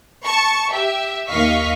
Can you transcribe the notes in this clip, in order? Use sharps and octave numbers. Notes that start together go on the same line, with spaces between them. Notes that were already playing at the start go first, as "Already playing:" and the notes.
A5 C#6
G4 E5
D#2 D#5 F5 C#6 B6